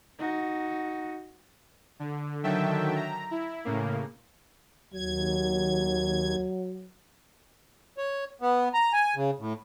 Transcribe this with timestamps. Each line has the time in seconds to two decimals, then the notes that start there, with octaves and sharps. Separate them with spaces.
0.18 D#4 F#4
2.00 D3
2.43 D3 D#3 F#3 E5 G5 A5
2.96 A#5
3.31 E4
3.65 A2 C#3 A#3
4.94 D#2 F#3 G#6
7.98 C#5
8.41 B3
8.74 A#5
8.93 G#5
9.16 C#3
9.40 A2